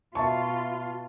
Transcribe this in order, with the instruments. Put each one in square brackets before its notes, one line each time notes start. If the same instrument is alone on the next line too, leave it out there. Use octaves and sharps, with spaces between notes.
[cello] B2 F4 [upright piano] E5 A5 C#6